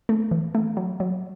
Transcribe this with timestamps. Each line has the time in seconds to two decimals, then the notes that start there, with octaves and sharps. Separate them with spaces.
0.09 A3
0.31 E3
0.55 A3
0.77 F#3
1.00 F#3